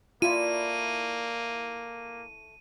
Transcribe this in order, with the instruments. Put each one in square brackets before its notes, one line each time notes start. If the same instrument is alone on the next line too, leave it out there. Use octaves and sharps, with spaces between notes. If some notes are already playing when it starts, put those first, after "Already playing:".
[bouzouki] A3 E4 D5 [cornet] A#3 [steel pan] F4 [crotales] D#7